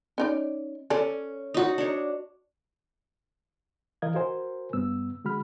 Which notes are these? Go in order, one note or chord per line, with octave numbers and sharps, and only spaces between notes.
C#4 D#4 D5
C#4 A4 D5
D#4 F#4
D4 C#5
E3 A#4 D#5 F5 G#6
F#4 A#4 C5 G#5
G2 B3 E6
D3 G#3 F#4 B5 F6